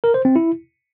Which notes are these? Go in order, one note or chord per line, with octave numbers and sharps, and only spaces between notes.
A#4
C5
C4
E4